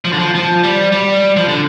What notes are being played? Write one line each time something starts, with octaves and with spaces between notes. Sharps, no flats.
F3
D3
F3
F3
G3
G3
F3
D3